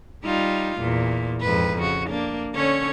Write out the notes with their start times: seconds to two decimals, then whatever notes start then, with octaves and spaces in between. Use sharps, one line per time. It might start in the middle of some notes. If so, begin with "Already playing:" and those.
0.25 G3 D#4 F4
0.79 E2 A#2
1.41 F2 G#2 B4
1.79 C#3 F#4
2.10 A#3 D4
2.55 D3 C#4 C#5